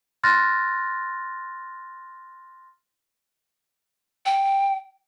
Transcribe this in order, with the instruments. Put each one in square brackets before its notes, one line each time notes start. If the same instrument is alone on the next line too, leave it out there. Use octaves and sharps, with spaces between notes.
[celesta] C6 F6 F#6 A6 A#6
[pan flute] G5